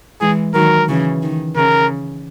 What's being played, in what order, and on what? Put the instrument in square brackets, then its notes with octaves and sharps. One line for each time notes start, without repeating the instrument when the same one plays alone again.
[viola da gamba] E3 G#3 [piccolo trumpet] G#4
[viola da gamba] D#3 F#3 [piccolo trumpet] A#4
[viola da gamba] C#3 E3
D#3
[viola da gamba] C#3 [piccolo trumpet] A#4